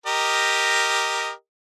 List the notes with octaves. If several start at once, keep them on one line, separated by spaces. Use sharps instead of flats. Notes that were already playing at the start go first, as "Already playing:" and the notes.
G4 A#4 D#5